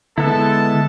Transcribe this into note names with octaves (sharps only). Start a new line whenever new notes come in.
D3 G#3 B3 E4 A4 A5